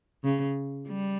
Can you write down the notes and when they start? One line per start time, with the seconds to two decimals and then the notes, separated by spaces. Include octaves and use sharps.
0.24 C#3
0.88 G3